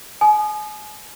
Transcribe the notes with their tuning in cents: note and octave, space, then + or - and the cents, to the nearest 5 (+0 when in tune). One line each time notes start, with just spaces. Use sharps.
G#5 +35 D#6 -25